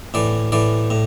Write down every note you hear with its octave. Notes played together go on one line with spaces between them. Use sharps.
A2 E3 D5
A2 E3 D5
A2